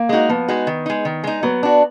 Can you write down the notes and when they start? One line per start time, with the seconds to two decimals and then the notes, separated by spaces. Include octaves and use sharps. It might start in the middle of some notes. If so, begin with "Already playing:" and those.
Already playing: A#3
0.09 G#3 D#4 F#4
0.29 F3 B3
0.48 G#3 D#4 F#4
0.67 D#3
0.86 G#3 D#4
1.05 D#3
1.24 G#3 D#4
1.43 F#3 B3
1.63 D4 F#4